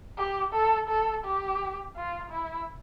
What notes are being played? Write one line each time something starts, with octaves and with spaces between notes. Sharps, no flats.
G4
A4
A4
G4
F4
E4